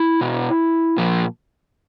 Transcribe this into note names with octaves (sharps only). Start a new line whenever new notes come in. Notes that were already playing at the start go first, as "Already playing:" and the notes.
Already playing: E4
B2
A#2 F3